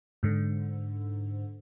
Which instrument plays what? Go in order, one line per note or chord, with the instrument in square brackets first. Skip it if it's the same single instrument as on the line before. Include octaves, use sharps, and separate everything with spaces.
[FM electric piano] G#2 D3